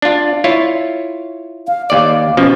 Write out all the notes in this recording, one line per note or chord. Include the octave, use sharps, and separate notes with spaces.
D4 F4
E4 F4 C#5
F5
D#2 D5 F5
B2 F3 C#4